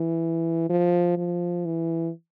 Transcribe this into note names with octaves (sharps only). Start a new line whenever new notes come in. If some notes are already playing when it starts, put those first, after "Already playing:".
Already playing: E3
F3
F3
E3